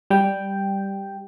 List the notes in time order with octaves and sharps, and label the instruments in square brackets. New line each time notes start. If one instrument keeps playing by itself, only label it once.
[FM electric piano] G3 G5